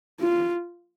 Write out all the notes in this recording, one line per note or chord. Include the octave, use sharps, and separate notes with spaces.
F4